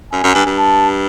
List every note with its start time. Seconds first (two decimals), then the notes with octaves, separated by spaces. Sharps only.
0.12 F#2 G#5
0.24 F#2
0.35 G2
0.46 G2
0.56 A5